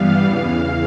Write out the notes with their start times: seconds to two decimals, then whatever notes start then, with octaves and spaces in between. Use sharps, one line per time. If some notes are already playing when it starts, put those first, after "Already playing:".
Already playing: G2 E3 G3 B3 F5
0.24 E2 C#3 E3 F5